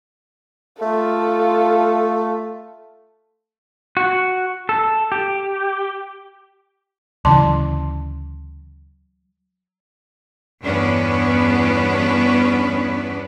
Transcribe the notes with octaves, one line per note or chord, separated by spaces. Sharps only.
A3 F4 A4
F#4
A4
G4
D2 C#3 E3 F#3 A5 C6
E2 G2 B3 C#4 D4 B4